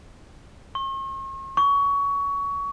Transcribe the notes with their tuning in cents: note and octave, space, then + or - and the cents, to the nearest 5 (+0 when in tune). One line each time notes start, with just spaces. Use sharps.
C#6 -45
C#6 +25